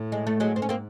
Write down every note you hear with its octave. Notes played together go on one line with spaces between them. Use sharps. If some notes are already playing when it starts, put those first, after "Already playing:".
Already playing: A2
G#3
A3
F#3 G#3
G#2 C4
C#4
A#3 C4